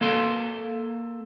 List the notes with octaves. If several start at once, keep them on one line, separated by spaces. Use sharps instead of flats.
A#3 A4 C6